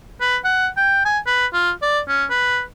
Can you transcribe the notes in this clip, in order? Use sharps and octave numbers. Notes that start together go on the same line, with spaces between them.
B4
F#5
G5
G#5
B4
F4
D5
C#4
B4